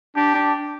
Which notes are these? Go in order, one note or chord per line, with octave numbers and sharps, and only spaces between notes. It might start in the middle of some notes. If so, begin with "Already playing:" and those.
D4 G4
D4